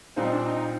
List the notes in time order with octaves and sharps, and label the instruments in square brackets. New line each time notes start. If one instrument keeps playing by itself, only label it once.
[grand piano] A#2 G3 C4 F4 C5 [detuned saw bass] D#4
[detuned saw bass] D4
D#4